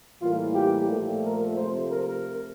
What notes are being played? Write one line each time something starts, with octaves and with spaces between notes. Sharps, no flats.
A2 E3 G3 A#3 F4
G4
A#2 F3 A3
A#4
C3 F3 A3 C5
A#4